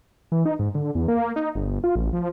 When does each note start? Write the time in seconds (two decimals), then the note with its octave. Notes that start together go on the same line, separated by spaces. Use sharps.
0.32 E3
0.45 D#4
0.59 G#2
0.75 D3
0.95 E2
1.08 A#3
1.36 D#4
1.55 G1
1.84 F4
1.95 A1
2.13 F3